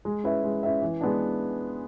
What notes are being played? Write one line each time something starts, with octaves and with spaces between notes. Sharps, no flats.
G#3
C#4 E4 B4 E5
G#3
C#4 E4 B4 E5
E3
G#3 B3 D4